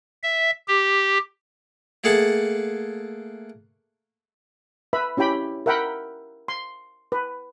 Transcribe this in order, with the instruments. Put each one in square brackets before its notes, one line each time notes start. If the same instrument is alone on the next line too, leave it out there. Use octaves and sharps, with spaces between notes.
[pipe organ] E5
G4
[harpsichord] A3 A#3 G#4 F#5 A5
[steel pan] B4 E5 B5
C#4 E4 G4 G5 B5
A#4 E5 F#5 G5 B5
C6
B4